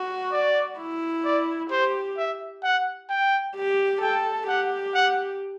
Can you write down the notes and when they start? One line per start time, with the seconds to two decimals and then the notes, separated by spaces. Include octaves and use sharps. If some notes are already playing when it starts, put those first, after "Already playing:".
Already playing: F#4
0.32 D5
0.79 E4
1.25 D5
1.70 G4 C5
2.18 E5
2.63 F#5
3.09 G5
3.56 G4
4.02 A4 G5
4.48 G4 F#5
4.94 F#5